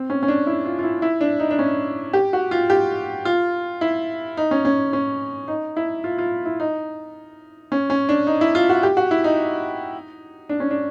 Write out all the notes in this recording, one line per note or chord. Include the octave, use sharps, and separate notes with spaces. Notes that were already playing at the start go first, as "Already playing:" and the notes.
Already playing: C4
C#4
C#4
D4
E4
F4
F4
E4
E4
D4
D#4
D4
C#4
G4
F#4
F4
G4
F4
E4
D#4
C#4
C#4
C#4
D#4
E4
F4
F4
E4
D#4
C#4
C#4
D4
D#4
E4
F4
F#4
G4
F#4
E4
D#4
D4
C#4
D4